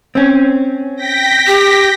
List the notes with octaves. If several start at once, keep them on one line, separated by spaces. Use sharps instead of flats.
C4 C#4
G5 A#6 B6
G4